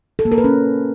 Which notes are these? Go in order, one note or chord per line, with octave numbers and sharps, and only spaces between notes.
A4
A#3
A#4
B4
C#4